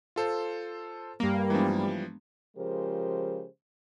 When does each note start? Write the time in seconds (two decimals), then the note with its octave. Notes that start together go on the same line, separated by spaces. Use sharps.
0.16 F4 A4 C5
1.20 G2 G3 A#3
1.50 E3 F3 G#3 B3 D4
2.56 C#3 F3 G#3 G4 A#4 C5